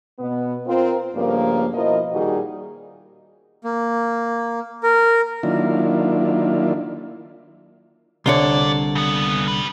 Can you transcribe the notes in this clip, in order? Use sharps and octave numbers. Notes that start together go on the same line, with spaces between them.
B2 B3
C4 F4 A#4
G2 C#3 F3 A3 A#3
B2 F3 E4 A#4 D#5
A#2 D#3 G3 D#4 F#4 G#4
A#3
A#4
D#3 F#3 A#3 D4 E4 F4
C2 D3 F4 C#5 D5
C#3 B3
G3 B4